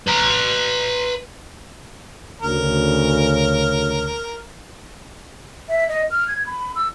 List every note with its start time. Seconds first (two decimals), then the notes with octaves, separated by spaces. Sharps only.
0.08 B4 A#5
2.42 D2 C#3 A#4
5.69 E5
5.89 D#5
6.11 F6
6.28 G#6
6.46 B5
6.76 E6